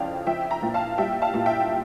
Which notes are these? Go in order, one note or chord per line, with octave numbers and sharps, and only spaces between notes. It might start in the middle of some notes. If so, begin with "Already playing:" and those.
Already playing: F2 C#3 D5 F5 G5 A5
F3 E5 G5
G5 A#5
A#2
F5 A5
G3 E5 G5
F5 A5
A#2
E5 G5